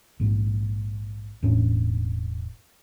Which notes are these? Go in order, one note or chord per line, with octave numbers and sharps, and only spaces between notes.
A#1 G#2
E1 A2 C#4 D4